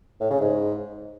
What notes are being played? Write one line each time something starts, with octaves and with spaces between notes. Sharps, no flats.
A2
C#3
G#2